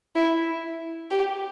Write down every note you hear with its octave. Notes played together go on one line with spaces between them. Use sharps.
E4
G4